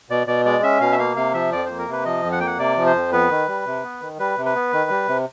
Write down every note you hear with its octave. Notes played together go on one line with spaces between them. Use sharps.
B2 D5
B2 D5
G#3 D5
C#4 E5
B2 F5
E5
A#3 F5
C3 F5
F3 E5
F2 D5
A#3 C5
A#4
C3 B4
F3 D#5
F2
F#5
A#3 G5
F#5
C3 D5
F3
C5
F2
B3 B4
D#3
G3
C3
B3
D#3
G3 B4
C3
B4
B3
D#3
G3
C3